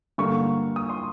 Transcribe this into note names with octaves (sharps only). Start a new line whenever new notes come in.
G2 D3 G3 A#3 C#6
D#6
C6